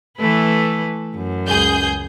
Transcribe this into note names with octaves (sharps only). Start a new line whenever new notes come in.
E3 A3 B4
F#2
C#2 G#4 G6